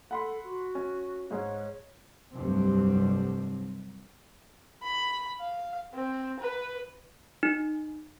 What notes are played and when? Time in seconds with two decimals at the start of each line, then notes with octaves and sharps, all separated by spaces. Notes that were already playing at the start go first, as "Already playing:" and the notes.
0.11 A4 F#5 B5 C6
0.44 F#4
0.75 C#4
1.31 G#2 G#3 C#5
2.32 F1 C2 G2 F#3 C4
4.83 B5
5.41 F5
5.94 C4
6.39 B4
7.43 D#4